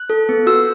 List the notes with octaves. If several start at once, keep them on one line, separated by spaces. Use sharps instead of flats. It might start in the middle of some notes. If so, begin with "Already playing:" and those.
Already playing: F#6
A4
B3
F#4 E6